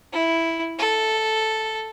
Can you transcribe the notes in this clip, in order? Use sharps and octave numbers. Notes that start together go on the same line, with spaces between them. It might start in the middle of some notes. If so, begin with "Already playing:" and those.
E4
A4